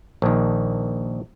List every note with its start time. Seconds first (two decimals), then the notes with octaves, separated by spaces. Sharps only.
0.22 A#1 D#3